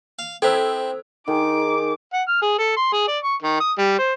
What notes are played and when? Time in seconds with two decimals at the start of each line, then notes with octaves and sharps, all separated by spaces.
0.19 F5
0.42 C4 E4 A4 C5 E6
1.28 D#3 D#4 G#4 D6
2.13 F#5
2.28 F6
2.42 G#4
2.59 A4
2.76 C6
2.93 G#4
3.08 D5
3.24 C#6
3.43 D#3
3.60 D#6
3.78 G3
3.99 C5